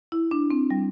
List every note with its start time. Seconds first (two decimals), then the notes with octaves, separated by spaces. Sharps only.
0.12 E4
0.31 D4
0.50 C4
0.70 G3